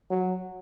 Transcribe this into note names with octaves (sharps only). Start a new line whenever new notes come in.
F#3